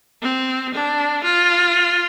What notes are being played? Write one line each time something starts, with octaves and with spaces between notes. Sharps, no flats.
C4
D4
F4